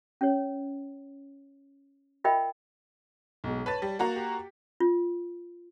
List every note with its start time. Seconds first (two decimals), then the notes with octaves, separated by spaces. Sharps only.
0.21 C#4 C#5
2.24 F4 A#4 D#5 E5 G5 B5
3.44 B1 B2 G#3
3.66 B4 C#5 A5 A6
3.82 G3
3.99 A#3 F#4 A#5
4.16 G4
4.80 F4